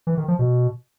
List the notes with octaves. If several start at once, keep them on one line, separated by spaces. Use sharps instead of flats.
E3
D#3
F3
B2